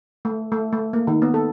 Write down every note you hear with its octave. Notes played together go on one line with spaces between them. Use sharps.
A3
A3
A3
A#3
D#3
B3
A4